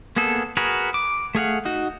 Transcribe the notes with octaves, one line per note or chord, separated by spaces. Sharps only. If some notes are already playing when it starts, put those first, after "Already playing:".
A#3 B3 G#4 A4
F#4 G#4 A#4 B4
D6
A3 G#4 F5 F#5
D#4 F#4